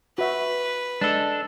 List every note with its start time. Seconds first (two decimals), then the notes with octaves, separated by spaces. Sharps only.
0.18 F#4 B4 E5
1.01 G#3 D4 A4